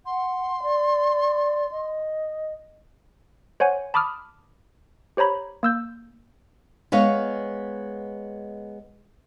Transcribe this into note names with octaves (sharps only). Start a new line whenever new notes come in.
F#5 C6
D5
D#5
C5 C#5 F#5 G#5
A5 B5 D6 D#6 F6
G4 C5 C#5 A#5 B5
A#3 E6 G6
G#3 B3 C#5 F5